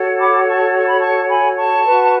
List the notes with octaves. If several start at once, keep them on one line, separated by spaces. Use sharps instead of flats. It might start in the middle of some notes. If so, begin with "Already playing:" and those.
Already playing: F#4 A4 C#5
B5 D6
A5 C#6
C#6
B5
A5 C#6
G#5 B5
A5 C#6
F#4 B4